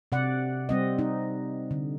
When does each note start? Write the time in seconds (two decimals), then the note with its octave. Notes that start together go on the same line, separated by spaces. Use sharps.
0.12 C3 D5 F#5
0.69 G3 C4 D#5
0.99 D#4
1.71 D3